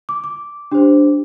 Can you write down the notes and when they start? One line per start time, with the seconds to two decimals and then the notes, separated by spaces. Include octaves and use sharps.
0.09 D6
0.24 D6
0.71 D4 G4 C5